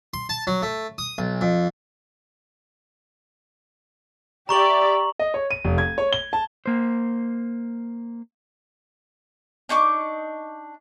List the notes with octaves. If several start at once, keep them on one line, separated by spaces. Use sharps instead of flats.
C6
A5
F#3
A3
D#6
B1
F2
G4 D5 E5 A#5 C#6 F#7
D#5
C#5
D#7
F1
G#6
C#5
G7
A5
A#3 C5
D4 D#4 C#6 D6